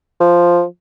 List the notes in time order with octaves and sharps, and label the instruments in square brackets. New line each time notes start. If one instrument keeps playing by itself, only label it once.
[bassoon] F3